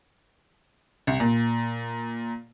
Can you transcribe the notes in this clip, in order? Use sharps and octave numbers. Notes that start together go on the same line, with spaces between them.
C2
A#2